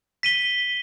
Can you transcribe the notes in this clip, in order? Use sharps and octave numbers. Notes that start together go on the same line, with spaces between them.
B6 D#7 G7